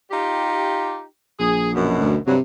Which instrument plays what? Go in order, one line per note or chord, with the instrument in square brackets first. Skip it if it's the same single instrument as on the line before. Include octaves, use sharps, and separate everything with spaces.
[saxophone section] D#4 F4 G4
[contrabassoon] A#1 [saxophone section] G#4
[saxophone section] F#2 B2
[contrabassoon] D2
[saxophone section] G2 F#3 [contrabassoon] C3